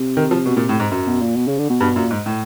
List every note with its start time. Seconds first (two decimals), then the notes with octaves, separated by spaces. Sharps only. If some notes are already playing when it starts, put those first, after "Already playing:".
Already playing: C3
0.17 D#3
0.31 F3
0.46 B2
0.57 A#2
0.69 A2
0.80 G#2
0.91 F#2
1.06 B2
1.21 A#2
1.36 B2
1.48 C#3
1.58 D3
1.70 B2
1.81 G2 B2
1.96 F#2 A#2
2.11 G#2
2.26 A2